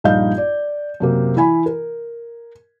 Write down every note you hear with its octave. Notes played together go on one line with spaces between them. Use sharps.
A#1 G2 D#4 D#5 F5 G6
D5
F#2 C3 A#3
E3 E4 G#5 B5
A#4